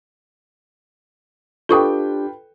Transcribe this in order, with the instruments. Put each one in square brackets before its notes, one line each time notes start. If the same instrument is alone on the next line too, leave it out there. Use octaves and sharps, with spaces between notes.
[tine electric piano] D4 G4 [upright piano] F4 B4 G5 [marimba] A4 C#6 D#6